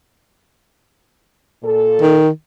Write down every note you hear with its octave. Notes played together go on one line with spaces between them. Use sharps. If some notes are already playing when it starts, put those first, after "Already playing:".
A#2 A4
D#3